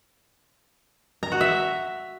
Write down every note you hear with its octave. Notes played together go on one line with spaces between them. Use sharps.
A#5
F#4
E5